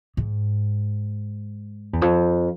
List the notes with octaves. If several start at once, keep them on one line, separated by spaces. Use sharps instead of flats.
G#2
E2
F2